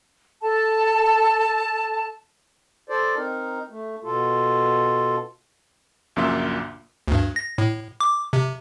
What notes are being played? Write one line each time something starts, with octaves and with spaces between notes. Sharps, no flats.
A4 A5
A4 C5 D5
C4 D#4 A#4
A3
B2 F4 A4
A#1 F#2 C#3 A#3 F4 E5
D2 G2
A#6
A2
D6
C3